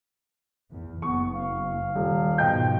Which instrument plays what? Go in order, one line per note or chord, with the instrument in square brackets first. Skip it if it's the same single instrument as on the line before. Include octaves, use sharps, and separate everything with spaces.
[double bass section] E2
[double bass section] F#1 [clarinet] B3 [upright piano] C#6
[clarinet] F5
[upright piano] D#1
[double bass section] G#2 B2 F3 [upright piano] D#5 G5 G6